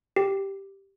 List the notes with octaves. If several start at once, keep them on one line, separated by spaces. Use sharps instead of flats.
G4